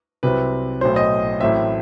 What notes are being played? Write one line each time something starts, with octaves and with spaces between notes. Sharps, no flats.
C2 C3 F#3 C4 B4
B1 A2 F#3 C5
D#5
A1 A2 F#3 C4 E5